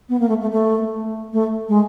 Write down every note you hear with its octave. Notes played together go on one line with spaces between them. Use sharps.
B3
A#3
A3
A3
A3
A3
G#3